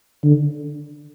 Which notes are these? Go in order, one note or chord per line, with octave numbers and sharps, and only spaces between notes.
D3